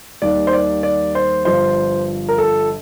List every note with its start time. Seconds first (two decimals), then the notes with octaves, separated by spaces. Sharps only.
0.22 D#2 D#3 G3 A#3 D5
0.47 C5
0.53 D5
0.83 D5
1.15 C5
1.45 G1 G2 F3 C5
2.29 A#4
2.38 A4